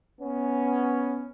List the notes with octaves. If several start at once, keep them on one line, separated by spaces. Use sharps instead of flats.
B3 C#4